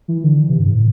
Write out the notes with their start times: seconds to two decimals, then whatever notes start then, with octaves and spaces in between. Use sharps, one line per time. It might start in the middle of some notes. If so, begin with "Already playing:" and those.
0.08 E3
0.24 D3
0.40 E3
0.49 C3
0.59 G2
0.71 A2